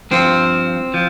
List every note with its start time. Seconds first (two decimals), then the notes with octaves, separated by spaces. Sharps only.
0.11 G2 F3 C4
0.94 F3